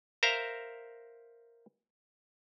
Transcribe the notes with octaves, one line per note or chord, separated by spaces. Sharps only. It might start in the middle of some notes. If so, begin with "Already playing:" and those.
A#4 C5 E5 F5 A#5